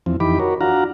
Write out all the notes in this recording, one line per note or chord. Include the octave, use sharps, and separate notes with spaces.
E2 F3 C4
F2 E3 D#4 G4 B5 D6
F#4 A#4 C#5
D4 F4 F#4 F5 F#5 A#5